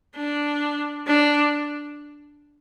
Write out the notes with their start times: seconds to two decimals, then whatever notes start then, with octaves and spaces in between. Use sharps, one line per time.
0.16 D4
1.07 D4